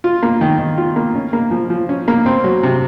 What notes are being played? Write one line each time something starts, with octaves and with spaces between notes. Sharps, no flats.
F4
A#3
D#3
D#3
F4
A#3
C#4
A#3
F3
F3
C#4
A#3
C4
F#3
C3